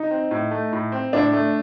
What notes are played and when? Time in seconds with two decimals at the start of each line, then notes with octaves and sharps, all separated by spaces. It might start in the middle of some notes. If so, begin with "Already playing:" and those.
Already playing: D#4
0.11 C4
0.31 A2
0.51 A3
0.73 A2
0.92 C4
1.13 A2 D4
1.33 A3